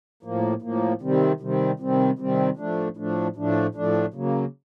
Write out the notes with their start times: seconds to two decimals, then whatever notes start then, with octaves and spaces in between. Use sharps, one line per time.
0.23 A2 F3 A#3
0.62 A2 F3 A#3
1.01 C3 D#3 G3 C4
1.40 C3 D#3 G3 C4
1.80 C3 D#3 G3 C4
2.19 C3 D#3 G3 C4
2.57 A2 F3 A3 D4
2.97 A2 F3 A3 D4
3.36 A2 F3 A3 D4
3.75 A2 F3 A3 D4
4.14 C#3 F#3 A#3